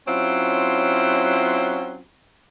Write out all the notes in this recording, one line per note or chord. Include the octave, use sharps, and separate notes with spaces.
F#3 C4 C#4 E4 F4